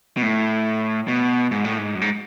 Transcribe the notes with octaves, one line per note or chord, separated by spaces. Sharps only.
B2
A2
B2
G#2
A2
G#2
F#2
G#2